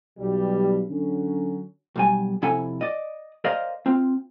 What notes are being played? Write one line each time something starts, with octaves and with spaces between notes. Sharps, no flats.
B1 B2 G3
D3 F#3 C#4
B1 G3 G#5
F2 C3 E4 A4 F#5 G#5
D5 D#5
A#4 C5 D5 D#5 F5
C4 F4